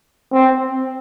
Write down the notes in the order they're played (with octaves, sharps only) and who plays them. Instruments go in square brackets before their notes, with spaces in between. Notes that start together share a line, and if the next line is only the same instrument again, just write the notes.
[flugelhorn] C4